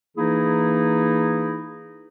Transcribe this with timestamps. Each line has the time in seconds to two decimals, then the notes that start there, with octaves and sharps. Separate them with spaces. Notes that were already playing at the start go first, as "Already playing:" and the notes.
0.17 E3 A#3 D#4 E4 G#4